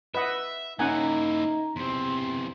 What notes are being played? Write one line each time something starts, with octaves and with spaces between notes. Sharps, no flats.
B4 D#5 E5 F#5
A#3 C#4 D#4 E4 F#5 G#5 A#5
E2 C3 C4 C6